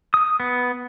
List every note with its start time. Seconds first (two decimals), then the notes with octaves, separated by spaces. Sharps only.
0.14 D#6
0.40 B3